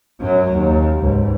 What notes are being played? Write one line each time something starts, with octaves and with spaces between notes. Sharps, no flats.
F#2 F#3
D#2
C#2 G#2